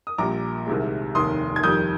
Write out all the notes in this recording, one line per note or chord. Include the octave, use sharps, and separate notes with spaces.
D#6
A#1 A#2 G3 A#5 D6
C2 C3 D#3 G#3
F1 D#2 D#3 C6 D#6
G#6
F2 D#3 G3 D#6 G6